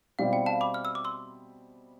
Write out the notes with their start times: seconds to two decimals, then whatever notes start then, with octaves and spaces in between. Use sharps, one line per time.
0.19 B2 G3 C4 E4 F5
0.33 G5
0.46 F5 A5
0.61 B5 D6
0.74 F6
0.85 E6
0.95 D6
1.05 C6 E6